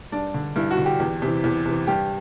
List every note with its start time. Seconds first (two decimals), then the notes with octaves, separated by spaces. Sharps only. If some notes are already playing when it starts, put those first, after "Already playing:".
0.12 G2 D4
0.34 D3
0.56 G2 E4
0.71 F#4
0.78 D3
0.85 G4
1.00 E2
1.22 C3 E3
1.44 E2
1.66 C3 E3
1.87 G2 G4